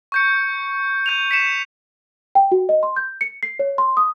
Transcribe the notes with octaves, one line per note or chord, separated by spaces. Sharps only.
C#6 G6 C#7
G6 D#7 F7
B6 C#7 E7
G5
F#4
D#5
C6
G6
C#7
C7
C#5
C6
D#6